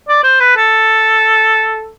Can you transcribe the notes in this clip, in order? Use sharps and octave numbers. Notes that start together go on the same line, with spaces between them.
D5
C5
B4
A4